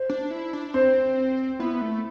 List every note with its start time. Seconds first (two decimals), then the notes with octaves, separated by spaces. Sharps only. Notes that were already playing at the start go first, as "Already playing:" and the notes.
Already playing: C5
0.09 D4
0.31 E4
0.53 D4
0.74 C4 C5
1.59 B3 E4
1.81 A3